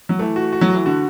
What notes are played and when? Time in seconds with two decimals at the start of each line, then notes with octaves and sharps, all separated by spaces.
0.09 F#3
0.19 E3 A3
0.36 F#4
0.52 F#4
0.61 F#3
0.68 E3 F#4
0.86 D3 F#4